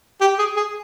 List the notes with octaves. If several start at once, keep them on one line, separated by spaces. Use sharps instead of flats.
G4
G#4
G#4